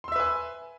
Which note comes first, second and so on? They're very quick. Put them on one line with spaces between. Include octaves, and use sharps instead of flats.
C6 E6 E5 B4 G#5